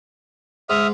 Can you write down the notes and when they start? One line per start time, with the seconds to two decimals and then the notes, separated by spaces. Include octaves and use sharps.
0.70 G#2 E5 D#6 F6